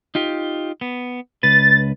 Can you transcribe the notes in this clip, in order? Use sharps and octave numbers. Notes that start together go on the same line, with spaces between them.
D#4 F4 G4
B3
C#2 B4 A6